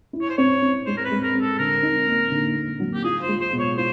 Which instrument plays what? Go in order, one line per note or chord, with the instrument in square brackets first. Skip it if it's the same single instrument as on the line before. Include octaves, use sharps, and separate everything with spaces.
[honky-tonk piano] E4
[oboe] C#5
C5
[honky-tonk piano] C4 [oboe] C#5
[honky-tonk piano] C4
[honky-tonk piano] G#3 [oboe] C5
[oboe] A#4
B4
[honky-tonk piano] G#3
[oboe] A#4
[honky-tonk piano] C4
[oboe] A4
[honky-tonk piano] D3 [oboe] A#4
[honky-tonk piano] D#4
A#3
D3
A#3
F#3
[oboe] G4
[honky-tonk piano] F4 [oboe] G#4
[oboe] C5
[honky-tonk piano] G#3
[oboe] C5
[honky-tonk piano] B2
[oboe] C#5
[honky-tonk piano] F4 [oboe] C5